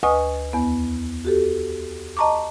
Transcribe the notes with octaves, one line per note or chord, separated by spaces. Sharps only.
D2 B4 D#5 G#5 C#6 D#6
E2 B3
F#4 G4 A4
D#5 A5 A#5 C#6 D6